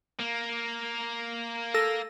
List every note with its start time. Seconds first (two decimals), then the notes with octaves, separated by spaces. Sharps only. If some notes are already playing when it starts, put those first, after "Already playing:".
0.19 A#3
1.74 A4 E6 A#6